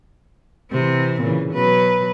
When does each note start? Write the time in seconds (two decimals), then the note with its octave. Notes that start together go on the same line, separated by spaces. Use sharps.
0.71 C3 E3 C4
1.21 A#2 C#3 E3
1.52 B2 F#3 B4